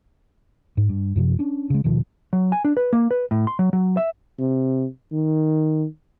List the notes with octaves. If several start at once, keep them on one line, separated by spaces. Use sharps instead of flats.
G#2
G2
F#2 C3 F3
C#4 D4
C#3 G#3
D#1 B2 D#3 F3
F#3
G#5
D4
B4
A#3
B4
A2
C6
F#3
F#3
E5
C3
D#3